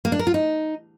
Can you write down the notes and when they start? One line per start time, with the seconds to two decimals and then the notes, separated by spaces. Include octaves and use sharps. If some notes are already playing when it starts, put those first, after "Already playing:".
0.05 A#3
0.12 D4
0.19 A#4
0.27 F4
0.34 D#4